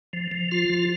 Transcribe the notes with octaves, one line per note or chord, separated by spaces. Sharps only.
F3
F3
F4
F3